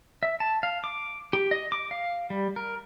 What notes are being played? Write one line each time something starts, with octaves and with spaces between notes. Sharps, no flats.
E5
A5
F5
D6
G4
D#5
D6
F5
G3
A#4